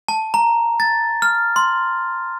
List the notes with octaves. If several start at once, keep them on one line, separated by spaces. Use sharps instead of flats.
A5
A#5
A6
F6
C6